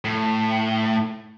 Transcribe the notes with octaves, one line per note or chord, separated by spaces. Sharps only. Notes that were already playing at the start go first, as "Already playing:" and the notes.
A2